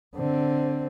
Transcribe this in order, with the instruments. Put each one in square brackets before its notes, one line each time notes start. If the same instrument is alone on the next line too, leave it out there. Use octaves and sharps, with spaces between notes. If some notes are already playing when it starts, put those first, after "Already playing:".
[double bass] D3 C4